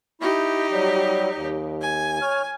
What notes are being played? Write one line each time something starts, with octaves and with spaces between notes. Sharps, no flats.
D#4 E4 G4
F#3 G3
D#2
G#5
C#5 F6